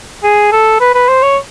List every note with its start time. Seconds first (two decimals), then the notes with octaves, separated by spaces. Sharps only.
0.23 G#4
0.52 A4
0.80 B4
0.95 B4
1.09 C5
1.23 C#5